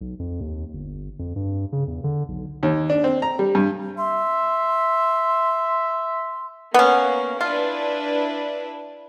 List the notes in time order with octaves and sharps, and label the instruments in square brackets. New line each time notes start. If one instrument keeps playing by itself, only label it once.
[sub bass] B1
F2
D#2
G1
F2
G2
C#3
E2
D3
B1
[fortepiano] D#2
D4
C4
A#5
G3
G2
[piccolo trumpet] E5 [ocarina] C6
[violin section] A#3 [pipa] B3 C#4
[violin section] D4 E4 B4 [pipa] F4